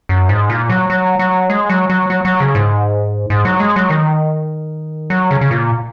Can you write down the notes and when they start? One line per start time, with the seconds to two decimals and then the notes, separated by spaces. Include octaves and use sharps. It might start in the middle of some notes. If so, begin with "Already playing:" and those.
0.09 F#2
0.29 G#2
0.50 A#2
0.70 F#3
0.90 F#3
1.19 F#3
1.50 G#3
1.69 F#3
1.90 F#3
2.10 F#3
2.25 F#3
2.40 C#3
2.55 G#2
3.30 G#2
3.45 F#3
3.60 G#3
3.76 F#3
3.90 D#3
5.10 F#3
5.31 C#3
5.41 C#3
5.51 A#2